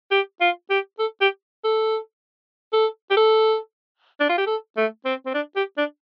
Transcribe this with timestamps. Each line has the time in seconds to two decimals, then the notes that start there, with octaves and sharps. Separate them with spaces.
0.11 G4
0.41 F4
0.70 G4
0.99 A4
1.21 G4
1.64 A4
2.73 A4
3.11 G4
3.17 A4
4.20 D4
4.29 F4
4.38 G4
4.47 A4
4.77 A3
5.05 C4
5.26 C4
5.34 D4
5.56 G4
5.77 D4